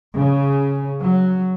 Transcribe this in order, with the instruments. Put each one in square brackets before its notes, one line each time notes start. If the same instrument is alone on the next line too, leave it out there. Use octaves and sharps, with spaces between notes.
[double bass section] C#3
F#3